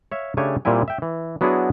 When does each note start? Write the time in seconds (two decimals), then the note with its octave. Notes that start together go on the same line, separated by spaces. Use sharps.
0.12 C#5 E5 F5
0.37 C#3 A3 D4 G4 C#5 G#5
0.65 A#2 G3 C4 E4 G#5
0.88 E5 G5
1.02 E3
1.41 F#3 B3 D4 E4 F#4 G#4